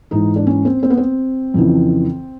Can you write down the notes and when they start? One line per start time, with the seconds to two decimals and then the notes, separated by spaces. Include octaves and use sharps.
0.11 G#2 E3 D#4
0.36 D4
0.47 C#4
0.65 C4
0.83 C4
0.90 B3
0.97 C4
1.54 F2 C#3 E3